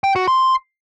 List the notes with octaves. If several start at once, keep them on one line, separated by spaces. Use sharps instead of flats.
G5
F#4
C6